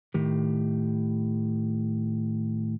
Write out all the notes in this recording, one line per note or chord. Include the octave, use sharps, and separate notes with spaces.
A2 D#3 G4